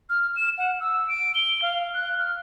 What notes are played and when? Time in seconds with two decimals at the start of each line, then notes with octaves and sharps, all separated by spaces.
0.10 F6
0.36 E7
0.58 F#5
0.80 E6
1.08 D7
1.35 G7
1.62 F5
1.94 F#6
2.19 F6